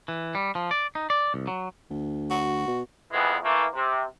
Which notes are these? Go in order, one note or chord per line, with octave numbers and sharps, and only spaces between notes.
E3
G3
F3
D5
D#4
D5
C2
F#3
D2
F#4
B2
F2 E3 G#3 B3
E3 A3 A#3
C3